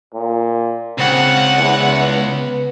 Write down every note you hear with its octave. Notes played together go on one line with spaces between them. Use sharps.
A#2
C#2 C4 F#5
E2
B3